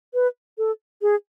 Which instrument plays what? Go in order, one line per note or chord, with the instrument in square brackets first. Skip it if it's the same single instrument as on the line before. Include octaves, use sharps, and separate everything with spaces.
[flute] B4
A4
G#4